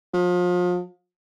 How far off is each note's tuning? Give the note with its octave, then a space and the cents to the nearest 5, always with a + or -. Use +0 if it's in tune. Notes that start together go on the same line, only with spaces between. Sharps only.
F3 +35